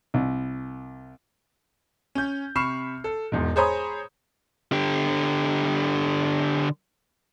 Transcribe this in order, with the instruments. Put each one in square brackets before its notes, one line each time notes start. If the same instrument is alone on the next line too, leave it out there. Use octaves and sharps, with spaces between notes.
[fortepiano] C2
[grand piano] C#4 G6
C3 B5 C#6 F6 C7 E7
A4
E1 E2 G#2
G#4 C5 C#5 A#5 B5 D#6
[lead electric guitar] D3 G4